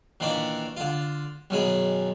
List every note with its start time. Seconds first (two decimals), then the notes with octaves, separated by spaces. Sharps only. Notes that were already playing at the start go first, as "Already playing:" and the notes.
0.20 A#2 D#3 E3 D4 D6
0.77 D3 F4
1.50 B1 F#2 D#3 G#4 B5